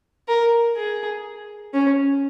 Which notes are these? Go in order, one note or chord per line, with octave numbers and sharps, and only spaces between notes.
A#4
G#4
C#4